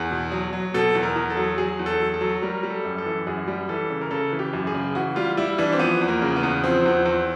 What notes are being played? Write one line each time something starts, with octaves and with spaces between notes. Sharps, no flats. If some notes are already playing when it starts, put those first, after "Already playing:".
Already playing: E2 G#4
B2
F#3
F#3
B2 A4
E2
A#4
E2
A4
F#3
F#3 G#4
E2
A4
F#3
A4
F#3
G3 A#4
G3
A4
F#2
A4
E3
F#2 G#4
G3
E3 A4
C#3
A#4
C#3 A4
E3
G4
F#2
G#4
C#3
E3 F#4
G3 F4
G3 E4
E3 D4
C4
F3 B3
E2
A#3
C#3
B3
E2
F3 C4
E2
E2